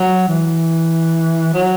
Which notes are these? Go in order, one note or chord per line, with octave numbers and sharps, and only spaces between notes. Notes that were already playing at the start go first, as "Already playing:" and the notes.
Already playing: F#3
E3
F#3